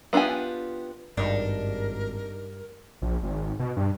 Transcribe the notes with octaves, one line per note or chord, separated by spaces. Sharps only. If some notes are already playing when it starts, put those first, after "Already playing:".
B3 D4 F4 G4 G#5
G#1 G2 D4 D#4 A#4
A#1
G#1
B2
G2